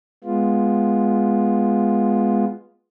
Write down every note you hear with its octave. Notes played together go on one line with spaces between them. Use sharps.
G#3 B3 F4